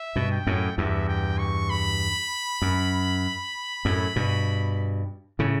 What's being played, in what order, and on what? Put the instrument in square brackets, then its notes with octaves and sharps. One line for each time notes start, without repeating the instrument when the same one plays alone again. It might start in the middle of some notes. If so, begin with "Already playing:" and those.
Already playing: [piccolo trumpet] E5
[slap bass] G2 B2
[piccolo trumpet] G5
[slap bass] F#2 A2
[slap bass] E2 G2 [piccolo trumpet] E5
[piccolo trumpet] G5
C#6
B5
[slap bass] F#2
F#2 A2
G2 B2
A2 C#3